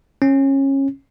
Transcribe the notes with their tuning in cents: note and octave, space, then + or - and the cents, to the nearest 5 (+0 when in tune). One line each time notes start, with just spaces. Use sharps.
C#4 -25